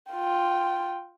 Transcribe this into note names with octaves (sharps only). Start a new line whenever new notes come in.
F4 G5